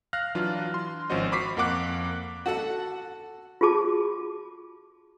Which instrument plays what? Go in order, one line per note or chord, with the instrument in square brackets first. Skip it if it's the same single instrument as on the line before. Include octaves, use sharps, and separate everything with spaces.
[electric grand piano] F5 F6 F#6 A#6
E3 F#3 D4 F4
C6
G#1 F3 C#4 F#4 C5 D#5
B5 C#6 D6 B6 C7
F2 A#3 F#5 D6 F#6
[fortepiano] F#4 A4 F#5
[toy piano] F4 F#4 G#4 A5 D6